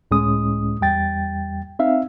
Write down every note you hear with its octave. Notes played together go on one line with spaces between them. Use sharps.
C#2 A2 G#3 C#4 D#6
E2 G3 G5 A6
C4 D#4 E5 F5